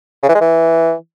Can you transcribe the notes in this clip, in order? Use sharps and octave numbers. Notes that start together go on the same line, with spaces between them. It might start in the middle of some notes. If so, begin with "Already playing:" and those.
C#3
E3
G#3
E3